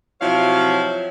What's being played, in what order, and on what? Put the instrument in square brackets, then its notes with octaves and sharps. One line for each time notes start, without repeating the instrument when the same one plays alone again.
[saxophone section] C3 F3 F#3 E4 C#5 F5